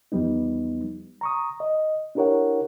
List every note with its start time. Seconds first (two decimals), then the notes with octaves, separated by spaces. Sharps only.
0.12 E2 F3 G3 B3 D#4
1.21 A#5 C#6 D#6
1.60 D#5
2.15 D4 E4 G4 A#4 C#5 F#5